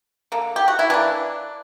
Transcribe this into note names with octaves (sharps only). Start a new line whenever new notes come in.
D3 A#3
G4
F#4
E4
E3 A#3 D4